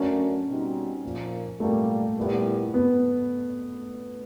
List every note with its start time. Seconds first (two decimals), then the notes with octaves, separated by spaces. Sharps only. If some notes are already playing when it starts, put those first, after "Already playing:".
Already playing: F#3 A3 C#4 D4 F#4 A#4
0.46 B2 G3 C4 D#4 F#4
1.04 A#2 F3 A#3
1.60 A#2 G3 A3 A#3
2.17 A#2 G3 B3 E4 G4
2.74 B3